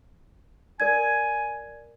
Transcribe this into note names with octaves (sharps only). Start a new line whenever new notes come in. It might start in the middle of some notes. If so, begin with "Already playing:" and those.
A#4 D5 G#5 G#6